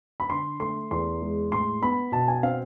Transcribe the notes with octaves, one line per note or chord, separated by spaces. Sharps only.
B5
D3 C6
A3 C6
E2 C6
G#3
A2 C6
B3 B5
B2 A5
G#5
C4 F5